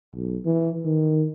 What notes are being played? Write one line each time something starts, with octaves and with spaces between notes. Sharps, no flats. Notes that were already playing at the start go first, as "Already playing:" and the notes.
B1
E3
D#3